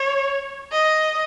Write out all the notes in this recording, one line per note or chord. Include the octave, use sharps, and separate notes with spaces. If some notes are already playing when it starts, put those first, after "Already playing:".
Already playing: C#5
D#5